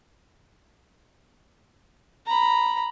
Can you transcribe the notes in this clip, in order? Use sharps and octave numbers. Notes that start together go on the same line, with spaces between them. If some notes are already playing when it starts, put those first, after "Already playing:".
A#5 B5